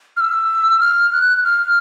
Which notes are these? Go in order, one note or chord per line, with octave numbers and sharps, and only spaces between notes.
F6
E6
F6
F#6
F6